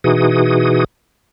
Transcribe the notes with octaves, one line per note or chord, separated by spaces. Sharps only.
B2 E3 D#4 F#4 G#4 D#6